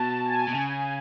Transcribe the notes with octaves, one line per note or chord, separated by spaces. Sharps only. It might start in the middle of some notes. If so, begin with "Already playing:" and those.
Already playing: B2 A5
G#5
B2 G#5
C#3